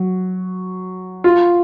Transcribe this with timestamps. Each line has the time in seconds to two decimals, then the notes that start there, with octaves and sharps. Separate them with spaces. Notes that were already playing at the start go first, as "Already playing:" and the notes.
Already playing: F#3
1.24 F4